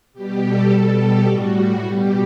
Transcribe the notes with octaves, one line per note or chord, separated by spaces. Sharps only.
B2 G3 G4
A4
B2 G3 A4
G4
A2 G3 F#4
F#4
B2 G3 G4